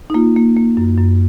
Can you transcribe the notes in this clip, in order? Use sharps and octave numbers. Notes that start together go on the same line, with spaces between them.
D#4
A#3 F4
A#3
A#3
F#2
F#2